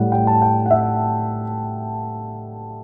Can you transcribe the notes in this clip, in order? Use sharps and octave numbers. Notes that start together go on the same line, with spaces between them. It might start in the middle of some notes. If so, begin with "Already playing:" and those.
Already playing: A2 G3 F#5
G5
A5
G5
F#5
E5